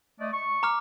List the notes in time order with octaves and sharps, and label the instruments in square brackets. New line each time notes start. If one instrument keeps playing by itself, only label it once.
[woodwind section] A3 D5 D#5
C#6
[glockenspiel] A#5 D6 F6